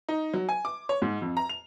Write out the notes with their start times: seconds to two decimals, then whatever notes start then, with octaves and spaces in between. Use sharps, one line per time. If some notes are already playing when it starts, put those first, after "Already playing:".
0.09 D#4
0.34 F#3
0.49 G#5
0.65 D6
0.89 C#5
1.02 G#2
1.22 F2
1.37 A#5
1.49 F7